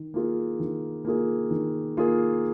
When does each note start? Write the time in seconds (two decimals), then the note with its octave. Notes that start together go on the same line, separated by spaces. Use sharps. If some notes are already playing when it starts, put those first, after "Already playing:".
Already playing: D#3
0.14 A#3 F4 G#4
0.60 D#3
1.05 A#3 F4 G#4
1.51 D#3
1.97 A#3 F4 G#4